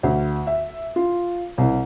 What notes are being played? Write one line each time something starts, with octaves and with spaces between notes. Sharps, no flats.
D2
E5
F4
C2